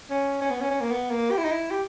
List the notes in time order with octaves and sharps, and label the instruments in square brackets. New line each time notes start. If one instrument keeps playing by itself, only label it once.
[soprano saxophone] C#4
C#4
B3
C#4
C#4
A#3
B3
A#3
G4
E4
D#4
E4
G4